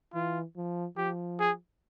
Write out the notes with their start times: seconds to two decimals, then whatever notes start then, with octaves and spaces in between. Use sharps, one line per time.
0.14 E3 F4
0.56 F3
0.97 F3 G4
1.39 G#4